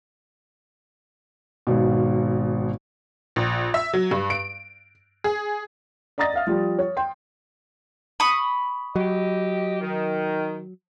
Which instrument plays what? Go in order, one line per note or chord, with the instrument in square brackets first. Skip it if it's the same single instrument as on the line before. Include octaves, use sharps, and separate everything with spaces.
[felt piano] G#1 B2
[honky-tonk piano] A#1
E5
F#3
G2
D7
G#4
[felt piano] D5 D#5 A#5 D#6 A6 A#6
E5 F5 F6
F3 G3
C#5
G5 C6
[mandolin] B5 C#6 D#6
[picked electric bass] F#3 [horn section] G4 D#5
[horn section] D#3